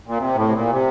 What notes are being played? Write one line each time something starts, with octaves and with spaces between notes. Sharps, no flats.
A#2
C3
A2
C3
A#2
C3